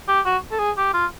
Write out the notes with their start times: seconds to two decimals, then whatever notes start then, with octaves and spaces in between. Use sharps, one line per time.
0.08 G4
0.25 F#4
0.51 A4
0.59 G#4
0.77 G4
0.94 F4